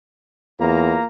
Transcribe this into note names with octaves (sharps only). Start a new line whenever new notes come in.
E2 A#3 F4 A#5